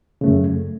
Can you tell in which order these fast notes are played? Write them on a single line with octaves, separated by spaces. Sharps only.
C#3 A3 F#2